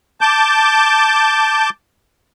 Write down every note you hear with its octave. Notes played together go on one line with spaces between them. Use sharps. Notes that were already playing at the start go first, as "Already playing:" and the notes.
A5 D6 G6